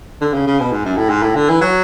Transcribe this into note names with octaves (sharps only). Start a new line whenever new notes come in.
D3
C#3
C#3
B2
G#2
F#2
A2
G#2
A2
D3
E3
F#3